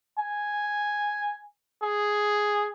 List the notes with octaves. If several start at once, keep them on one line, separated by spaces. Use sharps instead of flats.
G#5
G#4